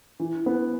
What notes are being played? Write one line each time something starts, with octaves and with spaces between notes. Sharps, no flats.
E3
B3